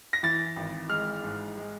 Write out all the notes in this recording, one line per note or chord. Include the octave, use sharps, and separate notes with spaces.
A#6
E3 A6
G#1
G#3 F6
G#2
G#3